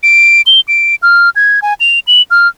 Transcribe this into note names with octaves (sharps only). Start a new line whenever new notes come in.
D7
G7
D7
F6
G#6
G#5
F7
F#7
F6